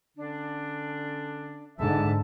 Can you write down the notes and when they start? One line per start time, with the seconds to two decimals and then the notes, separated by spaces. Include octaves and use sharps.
0.18 D3 C#4 D4
1.79 G#2 D3 E5 A5